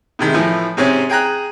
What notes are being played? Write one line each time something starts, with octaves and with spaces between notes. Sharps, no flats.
A2 C3 D#3 G#3
A2 E3 F3
G#2 C3 C4 C#4 G#5
G#4 G5 G#5 A#5 F#6